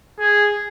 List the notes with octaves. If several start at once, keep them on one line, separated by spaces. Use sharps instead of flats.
G#4